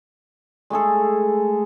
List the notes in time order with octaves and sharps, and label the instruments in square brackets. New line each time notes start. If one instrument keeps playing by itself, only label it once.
[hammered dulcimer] G#3 A3 G#4 A4